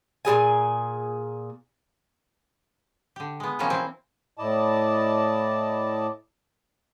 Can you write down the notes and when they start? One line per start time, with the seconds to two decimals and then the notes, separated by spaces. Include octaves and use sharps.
0.25 A#2 C4 G#4 G#5
3.16 D3 G4
3.40 G#3 B3
3.59 B2 E3 F3 G3 A#3 C#4
3.70 C4 E4
4.37 A2 E4 D5 D#5 A5